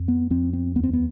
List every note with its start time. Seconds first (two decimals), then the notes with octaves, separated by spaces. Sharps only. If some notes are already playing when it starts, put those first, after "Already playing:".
Already playing: F2
0.08 B3
0.30 F2 C4
0.53 C4
0.75 D#2 B3
0.84 C4
0.93 B3